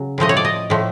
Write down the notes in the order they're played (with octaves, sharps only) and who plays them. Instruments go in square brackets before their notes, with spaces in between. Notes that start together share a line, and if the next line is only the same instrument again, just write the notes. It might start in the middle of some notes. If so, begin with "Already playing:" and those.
Already playing: [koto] C#3 F#3
A2 F3 A3 D#5
C#5
D5
D#5
A2 F3 A3